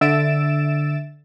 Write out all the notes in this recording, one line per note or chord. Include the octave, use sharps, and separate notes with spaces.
D3 E5 E6 A6 D7 E7